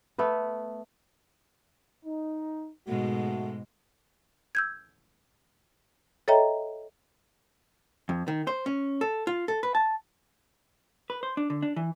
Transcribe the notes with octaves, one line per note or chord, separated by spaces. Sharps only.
A3 B3 B4
D#4
G#2 B2 G#3 A3 F#4
E6 G6 G#6
A4 C#5 D#5 E5 G5 A#5
F2
D#3
C5
C#4
A4
F4
A4
B4
A5
B4
C5
D4
D3
D4
E3